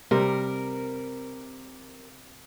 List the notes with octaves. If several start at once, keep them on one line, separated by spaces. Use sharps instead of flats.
C3 G3 A#4